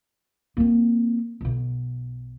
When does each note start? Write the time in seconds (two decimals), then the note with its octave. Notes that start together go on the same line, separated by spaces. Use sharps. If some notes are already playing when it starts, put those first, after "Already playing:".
0.57 A#3 C4
1.41 B1 B2